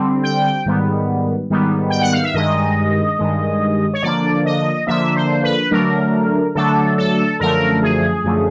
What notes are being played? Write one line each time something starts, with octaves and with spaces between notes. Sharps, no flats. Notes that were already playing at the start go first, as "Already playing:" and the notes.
Already playing: D3 G3 C4
G5
G#2 D#3 G3 B3
G#2 D#3 G3 B3
G5
F#5
F5
E5
G2 D#3 G#3 D#5
G2 D#3 G#3
C#5
D3 F3 A#3 D4 D5
D#5
D3 F3 A#3 D4 E5
C5
B4
D3 F#3 A3 D4 A#4
D3 F#3 A3 D4 A4
A4
F#2 D3 F3 A3 A#4
G#4
F#2 D3 F3 A3